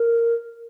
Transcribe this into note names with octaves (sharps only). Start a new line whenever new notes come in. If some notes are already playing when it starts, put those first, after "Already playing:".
Already playing: A#4